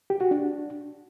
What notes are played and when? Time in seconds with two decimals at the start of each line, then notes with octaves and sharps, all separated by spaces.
0.10 G4
0.21 F#4
0.31 D4